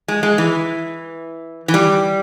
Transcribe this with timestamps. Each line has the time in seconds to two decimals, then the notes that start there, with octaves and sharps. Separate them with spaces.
0.08 G#3
0.23 G#3
0.38 E3
1.68 E3
1.74 G3